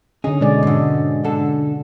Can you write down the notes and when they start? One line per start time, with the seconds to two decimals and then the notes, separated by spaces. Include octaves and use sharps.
0.24 D3 C#4 D#4 G#4
0.41 B2 G#3 D5
0.63 G#2 D3
1.24 D3 A4